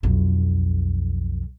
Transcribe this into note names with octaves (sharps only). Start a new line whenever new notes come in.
B1 F2